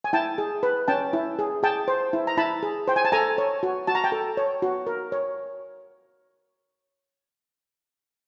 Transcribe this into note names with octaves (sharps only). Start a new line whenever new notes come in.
G#5
E4 G5 A5
G#4
B4
C#4 G5 A5
E4
G#4
G#4 G5 A5
C5
E4
A#5
E4 A5 B5
G#4
C5 G5
G#5
A5
A4 G#5 A#5
C#5
F#4
F#4 A5
A#5
G5 A5
A4
C#5
F#4
A#4
C#5